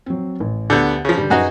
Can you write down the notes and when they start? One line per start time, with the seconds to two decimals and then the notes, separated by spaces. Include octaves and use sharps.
0.06 F#3 C4
0.40 A1
0.70 D2 D3 B3 G4 G6
1.05 C#3 F3
1.17 G2 D3 G3
1.30 F#2 D#4 F#4 G#4 B4